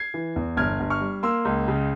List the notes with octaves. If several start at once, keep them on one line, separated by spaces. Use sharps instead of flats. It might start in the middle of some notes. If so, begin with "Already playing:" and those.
Already playing: G#6 C7
E3
E2
G1 F6 G#6
G1
C#6 F6
G3
A#3 C6 E6
C#2
C#3